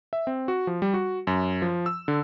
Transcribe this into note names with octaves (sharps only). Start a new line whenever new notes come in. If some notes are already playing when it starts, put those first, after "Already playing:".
E5
C4
F#4
F3
G3
F#4
F#2
F3
E6
D3